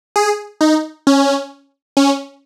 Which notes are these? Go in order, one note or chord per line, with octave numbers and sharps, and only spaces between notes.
G#4
D#4
C#4
C#4